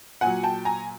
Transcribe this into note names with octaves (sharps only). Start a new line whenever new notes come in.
A#2 F#3 F#5 G#5
G5 A5
G#5 A#5